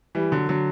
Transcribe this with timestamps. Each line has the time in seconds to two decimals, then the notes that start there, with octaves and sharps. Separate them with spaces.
0.15 E3 G3
0.32 D3 F#3
0.49 D3 F#3